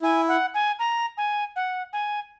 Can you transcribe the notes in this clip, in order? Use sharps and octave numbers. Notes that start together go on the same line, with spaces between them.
E4 G#5
F#5
G#5
A#5
G#5
F#5
G#5